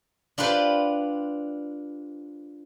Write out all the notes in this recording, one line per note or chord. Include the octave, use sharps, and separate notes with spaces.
D4 F4 G4 B4 C5